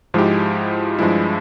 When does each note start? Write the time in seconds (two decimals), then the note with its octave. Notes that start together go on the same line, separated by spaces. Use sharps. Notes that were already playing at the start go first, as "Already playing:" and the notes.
0.14 G#2 F3 G#3 E4 G4
0.99 G2 F3 G#3 E4